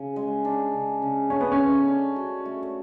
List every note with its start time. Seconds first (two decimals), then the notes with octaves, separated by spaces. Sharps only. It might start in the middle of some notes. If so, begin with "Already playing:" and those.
Already playing: C#3
0.16 G#3
0.45 D4
0.74 C#3
1.02 C#3
1.30 A3 C#4
1.41 B3
1.52 C#4
1.60 A3
1.88 D4
2.16 F#4
2.45 A3